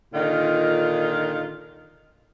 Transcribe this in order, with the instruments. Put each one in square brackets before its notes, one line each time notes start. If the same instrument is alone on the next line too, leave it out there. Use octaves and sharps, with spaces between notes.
[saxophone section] A#2 D3 D#3 D#4 F4